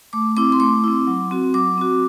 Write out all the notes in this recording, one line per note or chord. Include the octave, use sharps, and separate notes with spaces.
A3 D6
C4 E4 D6
C6
A3 D6
C4 E4
F#3
C4 F#4
F#3 D6
C4 F#4